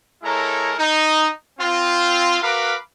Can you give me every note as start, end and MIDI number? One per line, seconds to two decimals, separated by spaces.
0.23 0.73 56
0.23 0.73 64
0.23 0.73 69
0.23 0.73 70
0.23 0.73 73
0.23 0.73 82
0.78 1.28 63
1.59 2.38 60
1.59 2.38 65
2.42 2.74 66
2.42 2.74 70
2.42 2.74 71
2.42 2.74 77
2.42 2.74 83
2.42 2.74 86